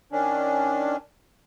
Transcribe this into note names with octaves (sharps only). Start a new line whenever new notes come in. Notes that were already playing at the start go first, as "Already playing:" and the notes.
D#3 C#4 D4